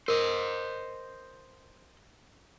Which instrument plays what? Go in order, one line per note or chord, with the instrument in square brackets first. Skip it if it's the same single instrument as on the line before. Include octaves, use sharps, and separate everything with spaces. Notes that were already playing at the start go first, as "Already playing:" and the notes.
[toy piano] A#4 [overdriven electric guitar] C5 D#5